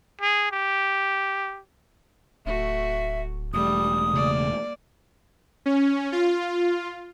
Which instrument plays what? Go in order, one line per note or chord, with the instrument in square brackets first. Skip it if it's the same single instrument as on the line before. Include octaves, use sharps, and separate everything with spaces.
[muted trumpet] G#4
G4
[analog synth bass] D1 [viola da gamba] A3 F#4 [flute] E5
[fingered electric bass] E1 A3 [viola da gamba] G3 [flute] D#6
[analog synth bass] C#3 [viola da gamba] A#3 D5
[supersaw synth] C#4
F4